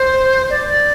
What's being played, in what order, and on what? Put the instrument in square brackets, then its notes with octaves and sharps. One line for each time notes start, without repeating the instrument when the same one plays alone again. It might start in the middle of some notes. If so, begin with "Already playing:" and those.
Already playing: [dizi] C5
D5